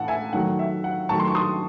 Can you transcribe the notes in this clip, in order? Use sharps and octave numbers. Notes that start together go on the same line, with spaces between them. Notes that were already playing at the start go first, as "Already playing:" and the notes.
Already playing: A2 E3 F#5 A5
E5 G#5
D#3 F#3 A3 F#5
E5
F#5
D#3 F#3 A3 A5 C#6
C6
C#6
C6 D#6